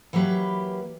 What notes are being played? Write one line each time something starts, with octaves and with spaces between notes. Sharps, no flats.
E3 F#3 A#3 G4 B4